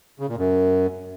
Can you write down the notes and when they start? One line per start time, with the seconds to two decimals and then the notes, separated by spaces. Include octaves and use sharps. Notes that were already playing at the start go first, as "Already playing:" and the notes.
0.20 C#3
0.29 A#2
0.38 F#2